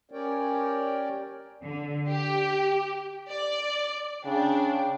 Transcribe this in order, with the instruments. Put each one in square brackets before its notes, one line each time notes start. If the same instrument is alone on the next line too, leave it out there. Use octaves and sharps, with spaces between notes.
[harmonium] C#4 G4 A#4 C#5 D5 G5
[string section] D3
G4
D5
[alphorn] C#3 [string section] D4 [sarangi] G5